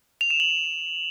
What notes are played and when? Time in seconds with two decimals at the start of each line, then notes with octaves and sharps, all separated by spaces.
0.21 F7
0.30 E7
0.40 F#7